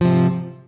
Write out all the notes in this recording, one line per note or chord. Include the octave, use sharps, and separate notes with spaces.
G#2 C3 F3